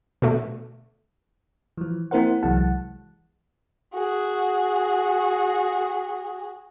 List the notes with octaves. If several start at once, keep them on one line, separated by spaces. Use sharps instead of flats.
B2 D3 A3
E3 F3
A#3 C4 E4 A#4 C5 F#5
C2 E3 F#3 G#3 F#5 A5
F#4 G#4